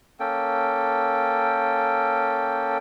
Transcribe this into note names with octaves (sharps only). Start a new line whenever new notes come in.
A#3 C#4 A4 G5